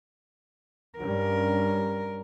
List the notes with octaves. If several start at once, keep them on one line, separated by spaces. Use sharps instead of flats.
G2 G3 C#4 A#4